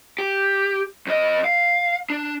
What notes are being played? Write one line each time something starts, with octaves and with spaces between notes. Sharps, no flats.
G4
F2 D#5
F5
D4